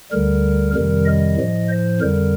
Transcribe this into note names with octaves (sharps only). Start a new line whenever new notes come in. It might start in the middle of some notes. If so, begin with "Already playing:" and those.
D2 D3 G3 A#4
F2 C3 D#3 G3 A#4
D#5
A2 F3
C5
F2 D3 G3 A#4